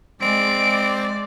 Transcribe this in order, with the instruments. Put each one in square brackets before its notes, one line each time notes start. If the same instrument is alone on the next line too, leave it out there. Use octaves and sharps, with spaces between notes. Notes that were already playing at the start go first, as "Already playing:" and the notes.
[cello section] G#3 [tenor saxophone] C4 [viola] D5 [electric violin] D7